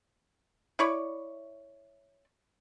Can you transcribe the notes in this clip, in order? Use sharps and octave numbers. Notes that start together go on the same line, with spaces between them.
E4 C#5 D5